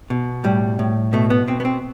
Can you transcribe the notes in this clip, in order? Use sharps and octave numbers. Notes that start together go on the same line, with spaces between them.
B2
A2 G3
A2
B2 A3
B3
B2 C4
B3
C4